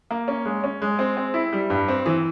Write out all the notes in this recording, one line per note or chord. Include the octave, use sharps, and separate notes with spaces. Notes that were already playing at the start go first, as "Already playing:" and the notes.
A#3
C#4
G#3
C#4
G#3
C4
C4
E4
G3
G2
C4
E3